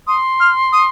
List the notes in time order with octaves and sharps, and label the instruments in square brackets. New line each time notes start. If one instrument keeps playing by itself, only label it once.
[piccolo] C6 [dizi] D#6
[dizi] F6
D#6